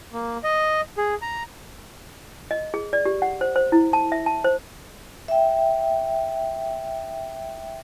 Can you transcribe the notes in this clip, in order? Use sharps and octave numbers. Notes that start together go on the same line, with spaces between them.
A#3
D#5
G#4
A#5
D#5
G#4
D5
G4
F#5
C5
C5
E4
A5
E5
A5
C5
E5 G5